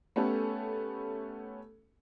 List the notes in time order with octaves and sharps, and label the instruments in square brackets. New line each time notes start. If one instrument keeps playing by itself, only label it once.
[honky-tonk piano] A3 B3 C#4 G4 A4